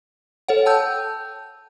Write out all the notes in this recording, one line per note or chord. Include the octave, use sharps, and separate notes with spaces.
A4 C#5 F#5
G5 A5 E6 G6